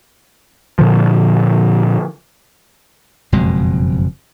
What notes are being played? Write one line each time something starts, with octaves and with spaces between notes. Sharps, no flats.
A#2 D3 F3
F#1 F2 B2 G#3